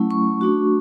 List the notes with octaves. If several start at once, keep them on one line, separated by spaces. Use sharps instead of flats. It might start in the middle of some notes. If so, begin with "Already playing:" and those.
Already playing: F#3 A3 C#4 E4
C#6
A3 D4 F#4